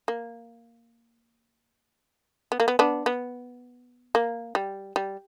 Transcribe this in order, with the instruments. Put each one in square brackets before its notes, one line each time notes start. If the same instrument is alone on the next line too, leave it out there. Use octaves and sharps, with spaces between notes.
[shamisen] A#3
B3
A#3
B3
B3 D4
B3
A#3
G3
G3